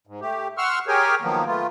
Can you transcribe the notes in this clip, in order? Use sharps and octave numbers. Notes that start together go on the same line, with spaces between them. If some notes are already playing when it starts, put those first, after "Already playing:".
G#2
A3 G4
F#5 C6 C#6 E6 F6
G4 G#4 A#4 C#5 G5 G#5
D#3 F3 F#3 A#3 B3
A3 B3 F4